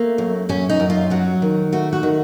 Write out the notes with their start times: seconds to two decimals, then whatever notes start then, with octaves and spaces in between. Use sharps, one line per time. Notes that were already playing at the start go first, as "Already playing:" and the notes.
Already playing: A3 A#3
0.18 F#2
0.49 F#2 C#4
0.70 D#4
0.80 F#2
0.90 F4
1.10 F#3 F#4
1.42 D#3
1.72 A3 F#4
1.93 F#4
2.03 D#3